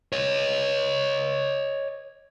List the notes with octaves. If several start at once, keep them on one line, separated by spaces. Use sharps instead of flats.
C#5 D#5